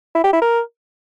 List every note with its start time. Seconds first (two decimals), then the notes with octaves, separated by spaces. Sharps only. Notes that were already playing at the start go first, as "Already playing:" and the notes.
0.15 E4
0.24 G4
0.33 E4
0.42 A#4